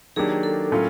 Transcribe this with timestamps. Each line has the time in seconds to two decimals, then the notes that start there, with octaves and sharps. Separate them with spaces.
0.16 D#3 F#3 A#3 D4 G4 G#4
0.43 A4
0.71 A2 F#3 A#3 C#4 F4